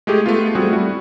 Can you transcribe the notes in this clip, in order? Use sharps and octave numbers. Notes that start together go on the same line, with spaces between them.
G#3 A3 G4 G#4
A3 B3 F4
G3 A3 C4 F#4 G#4
G3 E4 F#4